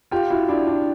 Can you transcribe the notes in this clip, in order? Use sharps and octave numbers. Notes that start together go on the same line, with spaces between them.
F4 G4
E4 F#4
D4 E4
D4